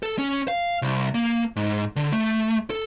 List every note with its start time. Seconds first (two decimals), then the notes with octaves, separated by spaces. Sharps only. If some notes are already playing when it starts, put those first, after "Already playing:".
0.03 A4
0.19 C#4
0.48 F5
0.82 C2
1.14 A#3
1.56 G#2
1.96 D3
2.12 A3
2.70 A4